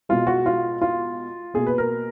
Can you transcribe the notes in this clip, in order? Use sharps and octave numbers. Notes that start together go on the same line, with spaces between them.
B2 G#3 F4
F#4
F4
F4
B2 A#3 G#4
B4
A#4